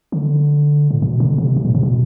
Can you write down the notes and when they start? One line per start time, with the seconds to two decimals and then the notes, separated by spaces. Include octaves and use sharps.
0.12 D3
0.91 A2
1.02 B2
1.20 D3
1.38 C3
1.57 B2
1.65 A2
1.75 C3
1.83 B2